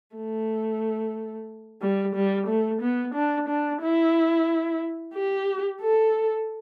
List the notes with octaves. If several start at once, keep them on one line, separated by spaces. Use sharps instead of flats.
A3
G3
G3
A3
B3
D4
D4
E4
G4
A4